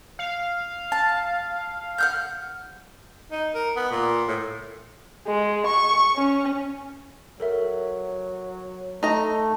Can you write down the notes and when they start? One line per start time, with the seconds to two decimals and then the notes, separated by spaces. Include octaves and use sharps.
0.19 F5
0.92 A5
1.98 F#5 F6 G6
3.32 D#4
3.54 A#4
3.76 B3
3.91 A#2
4.28 A2
5.27 G#3
5.67 C#6
6.16 C#4
7.40 F#3 A4 A#4 E5
9.03 A3 D#4 A#5